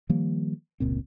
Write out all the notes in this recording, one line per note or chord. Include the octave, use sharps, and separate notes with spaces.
D#3 F3 G3 A#3
F1 C#2 A#2 C4